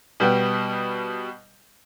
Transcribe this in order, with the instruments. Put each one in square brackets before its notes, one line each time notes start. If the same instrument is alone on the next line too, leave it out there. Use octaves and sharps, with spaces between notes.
[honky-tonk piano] B2 G3 B3 G5